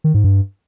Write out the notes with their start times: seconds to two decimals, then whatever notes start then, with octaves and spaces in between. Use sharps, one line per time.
0.04 D#3
0.14 G#2
0.24 G2